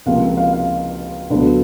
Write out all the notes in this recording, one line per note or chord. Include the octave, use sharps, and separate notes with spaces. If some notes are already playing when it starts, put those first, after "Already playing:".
C#2 C3 F3 A#3 F5
F5
F5
D2 D3 F#3 B3